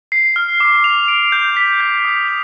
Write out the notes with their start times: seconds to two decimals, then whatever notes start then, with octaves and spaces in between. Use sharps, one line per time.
0.12 C7
0.36 F6
0.60 D6
0.84 F7
1.08 D7
1.32 G6
1.57 B6
1.80 G6
2.05 D#6
2.28 F7